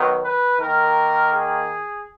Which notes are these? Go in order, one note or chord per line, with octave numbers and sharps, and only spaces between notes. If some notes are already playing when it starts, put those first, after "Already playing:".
Already playing: D#3 F#3 B3
B4
D#3 A#3 A#4
G#4